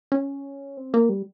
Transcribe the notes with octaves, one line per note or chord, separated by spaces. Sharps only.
C#4
C4
A#3
G3